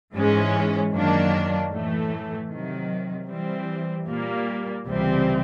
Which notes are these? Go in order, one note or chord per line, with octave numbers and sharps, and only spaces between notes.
G#2 E3 G#3 C#4
F#2 D#3 F#3 A#3 D4
A2 E3 A3
C3 D#3 F#3
E3 G3 C4
A#2 G3 A#3
C#2 C3 E3 G3 C4